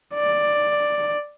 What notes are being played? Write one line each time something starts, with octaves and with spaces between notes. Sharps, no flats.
D5